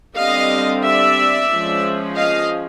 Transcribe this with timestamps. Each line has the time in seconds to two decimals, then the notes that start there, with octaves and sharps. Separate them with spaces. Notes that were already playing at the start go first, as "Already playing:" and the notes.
0.17 D3 G3 C4 D#5 F5
0.85 D5 E5
1.52 F3 G#3 C#4
2.17 D#5 F5